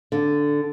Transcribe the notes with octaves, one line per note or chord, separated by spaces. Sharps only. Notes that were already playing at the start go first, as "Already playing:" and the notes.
D3